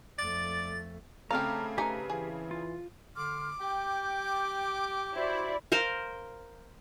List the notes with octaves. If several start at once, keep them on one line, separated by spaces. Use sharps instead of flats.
F2 A3 D5 A6
C#3 A3 C4 G4 A4 F5 A#5 F6
D#4 G4 B4 G#5 A#5
E3 G#4
F4
D3 C6 D6 F6
G4 G5
E4 F#4 C5 D5
A#4 C5 F5 C6